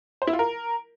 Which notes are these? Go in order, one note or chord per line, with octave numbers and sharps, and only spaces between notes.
C5
E4
F4
A#4